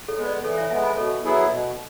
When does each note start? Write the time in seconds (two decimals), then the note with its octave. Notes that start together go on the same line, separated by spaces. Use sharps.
0.08 A4 C#5
0.17 G#3 B3
0.26 B4 D5
0.44 E3 A4 C#5
0.57 C#5 E5
0.70 G#3 B3 E5 G#5
0.83 G#5 B5
0.97 B2 A4 C#5
1.24 F#3 B3 E4 G#4
1.50 B2